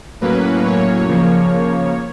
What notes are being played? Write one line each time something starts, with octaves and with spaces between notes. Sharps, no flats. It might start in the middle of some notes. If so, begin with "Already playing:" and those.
A2 F#3 A#3 C#4 B4
C#5
C#3 F3 A#3